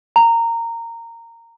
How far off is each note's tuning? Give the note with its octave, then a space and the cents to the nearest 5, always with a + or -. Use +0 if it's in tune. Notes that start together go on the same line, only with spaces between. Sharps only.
A#5 -15